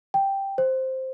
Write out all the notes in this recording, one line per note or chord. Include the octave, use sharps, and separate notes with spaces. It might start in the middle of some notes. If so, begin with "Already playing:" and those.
G5
C5